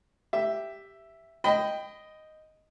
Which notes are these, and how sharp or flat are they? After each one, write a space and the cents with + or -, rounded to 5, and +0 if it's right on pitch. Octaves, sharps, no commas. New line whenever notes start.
G4 +0 E5 +5
D#5 +0 G5 +0 B5 +35